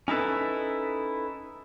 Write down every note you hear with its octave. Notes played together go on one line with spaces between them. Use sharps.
C#4 D#4 E4 A4 B4